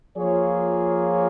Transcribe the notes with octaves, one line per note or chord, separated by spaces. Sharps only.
F3 A#3 F4 G#4 C#5